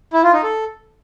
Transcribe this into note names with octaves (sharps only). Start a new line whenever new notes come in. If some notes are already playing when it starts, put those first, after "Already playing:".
E4
F4
D#4
A4